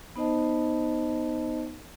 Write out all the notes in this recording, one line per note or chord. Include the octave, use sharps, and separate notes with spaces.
B3 D#4 C5 D#5 A5